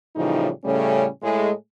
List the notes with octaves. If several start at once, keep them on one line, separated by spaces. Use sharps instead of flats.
A2 C#3 E3 F3 G3 D#4
A2 C#3 G3 A3 C#4
A2 G#3